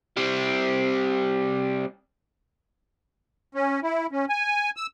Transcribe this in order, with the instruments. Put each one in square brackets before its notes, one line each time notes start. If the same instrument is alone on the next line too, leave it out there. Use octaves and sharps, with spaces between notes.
[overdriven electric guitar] G3 C4
[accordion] C#4
E4
C#4
G#5
E6